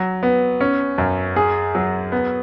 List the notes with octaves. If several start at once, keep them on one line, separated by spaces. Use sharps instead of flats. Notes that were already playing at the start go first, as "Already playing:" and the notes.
Already playing: F#3
B3
C#4
F#2
G#4
F#3
B3